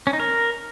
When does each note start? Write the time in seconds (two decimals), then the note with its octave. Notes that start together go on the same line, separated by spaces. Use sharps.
0.07 C#4
0.13 D#4
0.20 A#4